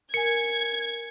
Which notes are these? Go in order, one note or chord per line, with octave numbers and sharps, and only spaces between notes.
A#4 G#5 G#6 C#7